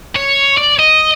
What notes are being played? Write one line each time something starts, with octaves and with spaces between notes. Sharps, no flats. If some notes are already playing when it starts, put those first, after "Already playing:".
C#5
D5
D#5